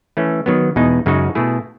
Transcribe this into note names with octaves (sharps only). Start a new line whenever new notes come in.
E3 A3 C#4
D#3 F#3 B3
E2 B2 G#3 D#4
F#2 C#3 G#3 D#4 F#4
B2 A3 E4 G#4